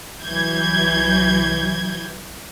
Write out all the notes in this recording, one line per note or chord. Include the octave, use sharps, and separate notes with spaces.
C2 E3 F#3 G6 G#6